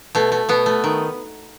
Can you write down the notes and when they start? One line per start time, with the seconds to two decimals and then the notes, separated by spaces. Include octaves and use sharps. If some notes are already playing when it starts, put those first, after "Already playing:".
0.15 B2 A3
0.32 A3
0.49 B2 B3
0.66 A3
0.84 D#3